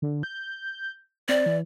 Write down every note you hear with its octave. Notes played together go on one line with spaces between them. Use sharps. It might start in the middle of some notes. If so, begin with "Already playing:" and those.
D3
G6
C4 D5
E3